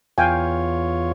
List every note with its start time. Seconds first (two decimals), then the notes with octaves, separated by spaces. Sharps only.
0.18 E2 F4 C#5 F5 G5 G#5